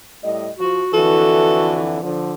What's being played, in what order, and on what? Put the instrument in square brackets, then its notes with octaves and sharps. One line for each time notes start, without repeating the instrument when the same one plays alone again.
[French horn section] A2 G3 D#5
[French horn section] F3 [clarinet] F#4
[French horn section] F2 D3 E3 [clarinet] F#4 [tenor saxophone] A4
[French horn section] D3 F3